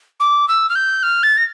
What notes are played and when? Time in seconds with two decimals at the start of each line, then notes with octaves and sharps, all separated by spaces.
0.20 D6
0.48 E6
0.69 F6
0.75 G6
1.03 F6
1.23 A6
1.37 A#6